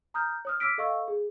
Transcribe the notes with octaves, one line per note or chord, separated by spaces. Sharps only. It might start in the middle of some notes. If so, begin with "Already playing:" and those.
A#5 D#6 F6 G6
C#5 D#6 F6
D6 E6 F6 B6 D7
A4 D#5 F5 C#6 E6
G#4